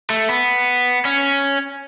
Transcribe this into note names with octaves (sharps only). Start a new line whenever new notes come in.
A3
B3
C#4